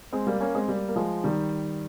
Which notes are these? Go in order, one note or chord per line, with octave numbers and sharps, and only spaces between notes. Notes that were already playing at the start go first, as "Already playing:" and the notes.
G#3 C4
G3 A#3
A#3 C#4
G#3 C4
G3 A#3
A#3
F3 G#3
D#3 G3